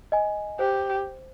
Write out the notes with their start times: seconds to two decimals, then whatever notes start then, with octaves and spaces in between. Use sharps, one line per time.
0.12 D#5 G#5
0.59 G4 C5